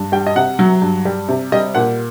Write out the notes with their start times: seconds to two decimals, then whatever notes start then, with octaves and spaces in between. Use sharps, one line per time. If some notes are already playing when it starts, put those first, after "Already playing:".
Already playing: G2
0.12 G3 G5
0.27 D#5
0.36 C3 F#5
0.59 F#3
0.82 G2
1.05 G3
1.28 C3
1.52 G3 D#5
1.75 A#2 F#5